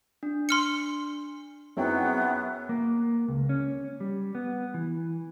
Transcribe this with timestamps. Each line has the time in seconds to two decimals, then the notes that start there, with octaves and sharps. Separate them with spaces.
0.23 D4
0.49 C6 F6 C#7
1.77 F#2 F#3 B3 C4 D#4 E4 G#4 G5
2.69 A#3
3.28 C#2
3.49 C#4
4.00 G3
4.35 B3
4.74 E3